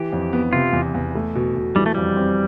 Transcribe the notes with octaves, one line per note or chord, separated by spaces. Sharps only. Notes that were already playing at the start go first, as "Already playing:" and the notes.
Already playing: E3 G4
F2
B3
C3 F4
E2
E2
A3
B2
B2
E3 G3
A3
F2 G3
C4